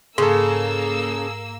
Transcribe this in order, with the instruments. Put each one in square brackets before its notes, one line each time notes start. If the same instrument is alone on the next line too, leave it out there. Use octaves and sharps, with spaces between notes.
[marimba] G#2 [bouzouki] C#3 [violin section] A#3 E6 [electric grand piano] G#4 A4